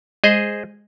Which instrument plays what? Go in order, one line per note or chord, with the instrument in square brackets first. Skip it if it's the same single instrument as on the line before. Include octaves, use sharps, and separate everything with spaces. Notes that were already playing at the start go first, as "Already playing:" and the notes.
[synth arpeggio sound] G#3 [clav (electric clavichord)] G#4 C5 D#5